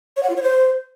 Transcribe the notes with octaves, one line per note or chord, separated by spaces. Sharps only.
C#5
F#5
F4
C#5
C5